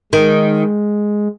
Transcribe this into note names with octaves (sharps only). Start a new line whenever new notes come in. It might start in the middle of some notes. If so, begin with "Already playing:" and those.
D#3 G#3